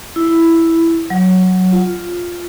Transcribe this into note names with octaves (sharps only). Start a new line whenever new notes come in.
E4
F#3
F4